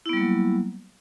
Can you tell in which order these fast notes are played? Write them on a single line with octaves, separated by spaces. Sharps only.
E4 B3 G3 A#3 F#3